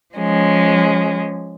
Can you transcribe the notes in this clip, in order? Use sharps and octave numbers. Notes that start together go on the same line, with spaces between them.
F3 G#3 C#4